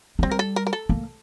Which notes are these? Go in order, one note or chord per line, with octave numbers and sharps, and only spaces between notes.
A3
G3 C4
A#4
A4
A#4
A#4
A4
A#3